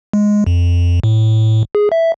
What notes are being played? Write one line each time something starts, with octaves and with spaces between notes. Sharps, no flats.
G#3
F2
A2
G#4
E5